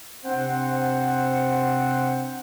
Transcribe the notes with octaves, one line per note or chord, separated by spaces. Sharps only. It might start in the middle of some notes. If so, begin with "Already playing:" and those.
C3 C4 D4 C5 F#5